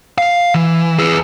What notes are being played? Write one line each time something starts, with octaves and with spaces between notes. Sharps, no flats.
F5
E3
G#4 B4